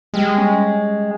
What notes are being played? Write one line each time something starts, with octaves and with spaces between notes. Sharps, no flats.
G3 G#3
C#4